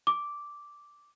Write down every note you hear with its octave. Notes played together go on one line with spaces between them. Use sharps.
D6